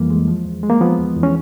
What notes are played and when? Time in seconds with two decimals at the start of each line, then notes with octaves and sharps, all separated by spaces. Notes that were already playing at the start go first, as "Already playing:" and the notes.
Already playing: F2 E3 G3 A#3
0.10 G#3
0.28 F3
0.45 E2
0.63 G#3
0.70 A#3
0.81 F3 B3
0.98 E2
1.16 E2
1.23 C#4